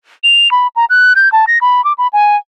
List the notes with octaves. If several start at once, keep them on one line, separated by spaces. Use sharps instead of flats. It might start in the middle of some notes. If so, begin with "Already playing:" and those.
F7
B5
A#5
F#6
G6
A5
A#6
B5
D6
B5
G#5